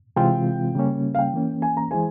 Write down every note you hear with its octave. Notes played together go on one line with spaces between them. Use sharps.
C3 E3 G#3 C4 F4 G5
C#3 G3 A#3 C#4
F5
G5
E3 A#3 C#4
G#5
A#5
E3 G#3 E4 G#4 C5 G#5